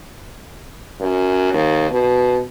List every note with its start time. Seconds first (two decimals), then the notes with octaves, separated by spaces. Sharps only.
1.00 F#2
1.53 D#2
1.90 B2